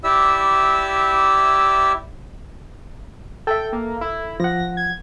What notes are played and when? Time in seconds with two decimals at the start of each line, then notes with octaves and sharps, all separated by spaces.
0.04 E4 G4 D5 E5 E6
3.47 A4 E5 G5
3.73 A#3
4.01 E4
4.40 F3 F#5 A#6
4.77 G#6